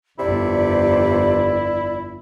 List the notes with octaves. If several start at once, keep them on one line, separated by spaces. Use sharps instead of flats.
G1 F2 C3 E4 D5